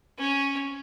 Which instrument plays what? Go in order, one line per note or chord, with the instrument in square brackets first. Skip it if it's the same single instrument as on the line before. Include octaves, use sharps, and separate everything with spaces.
[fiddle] C#4